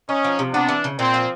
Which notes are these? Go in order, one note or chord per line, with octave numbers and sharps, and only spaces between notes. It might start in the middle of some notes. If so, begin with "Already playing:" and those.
C#4 D#4
F3
C3
B3 D4
E3
C#3
A#2 C4
F3